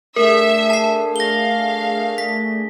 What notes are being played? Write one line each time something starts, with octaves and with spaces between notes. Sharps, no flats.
A3 D4 G#4 A#4 E5
A5 C7
F5 A#6 G7
B6